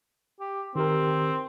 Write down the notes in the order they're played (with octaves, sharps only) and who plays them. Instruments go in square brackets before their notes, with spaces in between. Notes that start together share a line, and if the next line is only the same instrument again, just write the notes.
[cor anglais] G4
[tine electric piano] D#3 G4 A#4 [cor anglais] C4